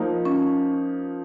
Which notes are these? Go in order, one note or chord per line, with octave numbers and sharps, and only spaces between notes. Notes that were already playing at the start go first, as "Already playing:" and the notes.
Already playing: F3 A#3 D#4
C#4